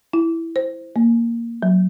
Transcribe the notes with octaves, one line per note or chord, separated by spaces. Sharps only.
E4
C5
A#3
F#3